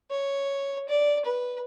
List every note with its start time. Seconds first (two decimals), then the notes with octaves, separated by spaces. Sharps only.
0.11 C#5
0.89 D5
1.25 B4